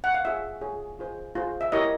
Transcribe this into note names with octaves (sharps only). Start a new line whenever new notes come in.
F#5
F5
F4 G#4 C#5 E5
F4 G#4 C#5
F4 G#4 C5
F4 G#4 C5
E5
E4 G4 A#4 C#5 D#5